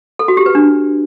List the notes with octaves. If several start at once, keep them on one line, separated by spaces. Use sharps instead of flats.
A4
F#4
G4
B4
D4